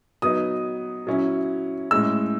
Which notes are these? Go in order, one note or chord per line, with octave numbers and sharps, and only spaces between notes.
F#3 B3 D#4 D#6
F#3 C#4 E4
A2 G#3 C#4 E6